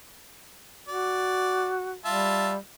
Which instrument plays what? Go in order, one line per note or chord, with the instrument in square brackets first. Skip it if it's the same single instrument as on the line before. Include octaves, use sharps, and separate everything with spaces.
[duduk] F#4 [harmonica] D5
[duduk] G3 [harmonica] F4 E5 A5